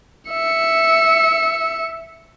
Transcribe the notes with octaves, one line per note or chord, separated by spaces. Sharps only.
E5 C#7